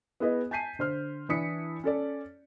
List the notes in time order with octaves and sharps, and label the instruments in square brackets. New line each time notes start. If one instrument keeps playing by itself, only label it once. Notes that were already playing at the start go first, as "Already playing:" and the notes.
[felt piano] B3 E4 G#4 B4 D#5
G#5 A5 G6 B6 C7 D#7
D3 C5 F6
E3 D4 E4 D#6 B6 C#7
C#4 A4 D5